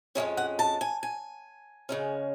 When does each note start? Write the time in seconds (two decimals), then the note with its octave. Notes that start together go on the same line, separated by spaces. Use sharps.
0.15 F2 C#3 G#3 C#4 C#5
0.37 F#5
0.59 A5
0.81 G#5
1.03 G#5
1.89 C#3 G#3 C#4